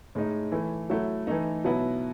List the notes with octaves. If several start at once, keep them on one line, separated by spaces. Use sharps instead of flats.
A2 G#3 D#4
E3 A3 E4
F#3 A3 E4
E3 A3 D#4
B2 F#3 B3 E4